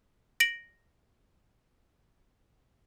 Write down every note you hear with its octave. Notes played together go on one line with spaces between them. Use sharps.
A#6 D7 F#7